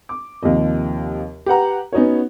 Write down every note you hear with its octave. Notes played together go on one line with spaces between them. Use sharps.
D6
D#2 C3 F3 D#5
G4 B4 F#5 A#5
B3 C#4 D#4 F#4 C#5